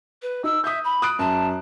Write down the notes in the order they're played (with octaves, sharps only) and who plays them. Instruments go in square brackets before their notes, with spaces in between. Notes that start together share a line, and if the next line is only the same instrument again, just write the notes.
[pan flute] B4
[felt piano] D#4 [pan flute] E6
[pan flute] E5 [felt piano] D#6 G6
[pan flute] B5
[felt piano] D#6 F#6 D7
[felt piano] F#2 [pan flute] A5